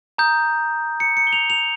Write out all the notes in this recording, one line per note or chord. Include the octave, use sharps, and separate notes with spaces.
A#5 D#6 G6
C#7
C#7
G7
F7
F7